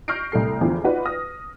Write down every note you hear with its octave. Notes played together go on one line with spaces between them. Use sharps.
C#6 F6 G6 A#6 C7 D7
C2 A2 A4 C7
E2 D3 E3 F3
D#4 F4 F#4 B4 D5
D#6 F6 A#6